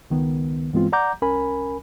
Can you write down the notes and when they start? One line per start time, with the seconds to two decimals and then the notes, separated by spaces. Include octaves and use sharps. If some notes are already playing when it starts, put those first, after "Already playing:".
0.10 C#2 D#3 B3
0.73 G2 E3 G#3 B3 C4 F4
0.92 D5 F#5 A#5 D6 G6
1.22 C2 C#4 A#4 G#5 B5